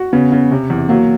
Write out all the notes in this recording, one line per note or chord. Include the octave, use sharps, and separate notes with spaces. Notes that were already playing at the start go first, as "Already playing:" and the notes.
Already playing: F#4
C#3 B3
C#3
C3
E2
F#3 A#3